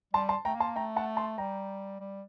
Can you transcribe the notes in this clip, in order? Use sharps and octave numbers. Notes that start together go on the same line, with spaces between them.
G3 A5 C6
A5 C6
A3 G5 A#5
A#3
A5 C6
A3 G5 A#5
F#5 A5
A5 C6
G3 G5 A#5
G3